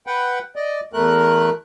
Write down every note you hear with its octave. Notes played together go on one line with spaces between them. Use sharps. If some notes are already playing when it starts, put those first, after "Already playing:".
B4 F#5 G5
D5 D#5
E2 A3 A#4 F#6